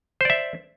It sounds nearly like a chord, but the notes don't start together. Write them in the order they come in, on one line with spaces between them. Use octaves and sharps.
C5 D5 E5